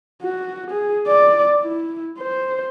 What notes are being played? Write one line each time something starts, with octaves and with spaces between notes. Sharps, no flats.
F#4
G#4
D5
E4
C5